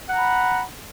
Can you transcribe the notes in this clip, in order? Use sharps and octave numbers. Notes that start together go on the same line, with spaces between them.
F#5 A#5 B5